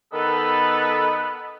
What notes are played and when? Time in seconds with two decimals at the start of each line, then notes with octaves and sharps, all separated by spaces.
0.13 D#3 B3 A4 B4